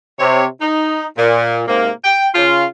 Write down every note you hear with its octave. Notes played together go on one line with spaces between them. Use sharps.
C3 C#5
D#4
A#2
G#2 C3 A#3
G5
C#3 F4